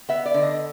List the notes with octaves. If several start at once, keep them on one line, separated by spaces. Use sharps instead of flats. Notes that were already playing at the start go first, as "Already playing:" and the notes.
B3 E5
D5
D3
D#5